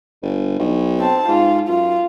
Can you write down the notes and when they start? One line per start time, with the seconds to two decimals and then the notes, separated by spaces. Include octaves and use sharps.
0.22 G1
0.59 B1
1.00 C4 A5
1.28 G#2 F4
1.69 F#2 F4